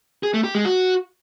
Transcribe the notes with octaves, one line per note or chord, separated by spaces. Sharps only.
G#4
A3
G4
G#3
F#4